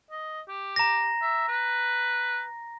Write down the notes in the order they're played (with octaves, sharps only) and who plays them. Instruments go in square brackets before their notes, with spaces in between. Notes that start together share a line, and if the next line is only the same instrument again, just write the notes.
[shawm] D#5
G4
[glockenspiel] A#5 A#6
[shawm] E5
B4